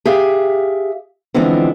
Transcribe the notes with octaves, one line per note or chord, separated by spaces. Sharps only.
G4 G#4 E5 F5
D3 E3 F3 G#3 B3 C4